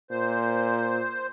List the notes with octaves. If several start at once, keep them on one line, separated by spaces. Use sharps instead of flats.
A#2 C5